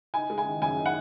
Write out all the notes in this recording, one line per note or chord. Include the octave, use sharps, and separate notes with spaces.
D#4 G#5
G#3
G#5
D#3
F#2 G#5
D#4
F#5